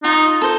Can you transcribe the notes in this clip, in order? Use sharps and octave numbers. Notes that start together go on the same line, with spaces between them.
D#4 F4
A4 C5